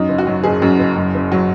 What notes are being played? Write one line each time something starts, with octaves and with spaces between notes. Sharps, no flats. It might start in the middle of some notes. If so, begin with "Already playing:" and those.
Already playing: F#2 D#4
F#1
F#4
F#3
F#1 G#4
F#2
F#1
F#2
F#1
F#3